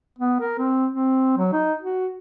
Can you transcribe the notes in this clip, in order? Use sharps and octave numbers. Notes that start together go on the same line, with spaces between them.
B3
A#4
C4
C4
F#3
D#4
F#4